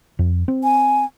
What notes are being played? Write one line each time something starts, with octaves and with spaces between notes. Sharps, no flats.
F2
C4
G#5